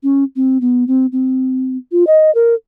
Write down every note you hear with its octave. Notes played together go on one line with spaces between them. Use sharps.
C#4
C4
B3
C4
C4
F4
D#5
A#4